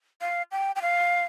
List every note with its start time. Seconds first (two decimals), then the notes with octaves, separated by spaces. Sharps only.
0.21 F5
0.52 G5
0.76 G5
0.82 F5